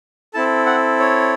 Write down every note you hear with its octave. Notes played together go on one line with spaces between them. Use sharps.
C4 E4 A4 A5
F#5
C#5